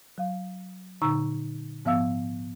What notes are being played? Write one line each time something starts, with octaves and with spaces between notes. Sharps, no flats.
F#3 F5
A#2 D3 D#4 A#5 C#6 E6
G#2 F3 B3 E5 F5 E6